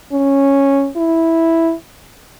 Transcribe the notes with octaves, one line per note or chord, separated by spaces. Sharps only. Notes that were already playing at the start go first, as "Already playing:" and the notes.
C#4
E4